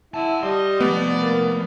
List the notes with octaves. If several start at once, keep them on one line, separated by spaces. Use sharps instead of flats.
E4 F#5 A5
G3 D#5 C6
F3 A3 B3 D5
A#3